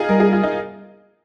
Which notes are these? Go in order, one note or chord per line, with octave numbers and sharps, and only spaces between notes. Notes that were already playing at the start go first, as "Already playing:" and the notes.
Already playing: D#4 F4 G#4
G3 A#4
G#4
F4
D#4